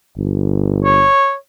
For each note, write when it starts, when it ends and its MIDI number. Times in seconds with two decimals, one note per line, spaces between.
0.18 1.07 31
0.85 1.35 73